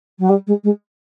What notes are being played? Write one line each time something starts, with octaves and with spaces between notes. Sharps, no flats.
F#3
G3
G#3
G#3